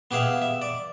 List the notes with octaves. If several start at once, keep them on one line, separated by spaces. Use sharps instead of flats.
B3 G4 G#4 E5 F5
E5
D5